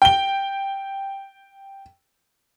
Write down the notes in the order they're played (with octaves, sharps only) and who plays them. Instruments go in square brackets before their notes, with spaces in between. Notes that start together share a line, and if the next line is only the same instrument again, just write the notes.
[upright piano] G5 G7